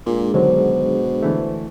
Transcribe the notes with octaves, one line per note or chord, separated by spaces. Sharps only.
A#2 G#3 D4 G#4
B2 D3 D#3 F#3 C5
D3 E3 A3